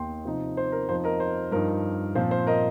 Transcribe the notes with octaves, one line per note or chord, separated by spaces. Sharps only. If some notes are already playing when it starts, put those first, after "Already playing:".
Already playing: D#2 D#3 A#3 D#4 G5 C6
C3 F3 D#4
C5
A#4
F2 F3 D#4 C5
A#4 D#5
C5
G2 F3 D#4 A#4
A#2 F3 C4 F4 C5
C5
A#4 D#5